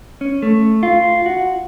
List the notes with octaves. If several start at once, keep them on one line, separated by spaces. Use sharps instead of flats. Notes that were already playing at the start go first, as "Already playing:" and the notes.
C#4
A3
F4
F#4